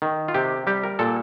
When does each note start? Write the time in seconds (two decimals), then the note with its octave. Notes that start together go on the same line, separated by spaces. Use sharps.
0.02 D#3
0.28 F4
0.34 C3 G4
0.67 G3 G4
0.83 A#4
0.99 A#2 A4